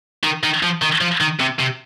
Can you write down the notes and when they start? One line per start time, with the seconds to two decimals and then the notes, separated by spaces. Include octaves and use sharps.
0.23 D#3
0.44 D#3
0.63 F3
0.82 D#3
1.01 F3
1.21 D#3
1.40 C3
1.60 C3